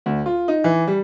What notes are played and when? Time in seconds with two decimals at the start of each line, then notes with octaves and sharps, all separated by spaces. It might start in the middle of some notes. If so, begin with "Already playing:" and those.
0.06 D2
0.26 F4
0.48 D#4
0.64 E3
0.88 G3